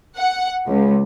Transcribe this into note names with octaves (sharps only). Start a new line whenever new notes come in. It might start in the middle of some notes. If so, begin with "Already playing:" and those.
F#5
C#2